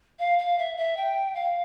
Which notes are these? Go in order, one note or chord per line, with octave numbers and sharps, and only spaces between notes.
F5
F5
E5
E5
G5
F5